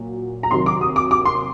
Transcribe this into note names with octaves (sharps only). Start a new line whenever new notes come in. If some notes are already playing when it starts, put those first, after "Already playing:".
Already playing: A#2 F#3
A#5
C3 D#3 F#3 C6
D6
D#6
D6
D6
C6